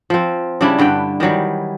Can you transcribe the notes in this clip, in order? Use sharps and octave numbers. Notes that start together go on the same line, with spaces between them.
F3 C4
C#3 G3 D4 E4
G2 D3 B4 G5
D#3 E3 F#3 G3